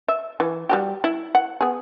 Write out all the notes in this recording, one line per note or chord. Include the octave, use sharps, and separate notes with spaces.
E5
E3
G3 F#4 G4
E4
F#5
B3 G#4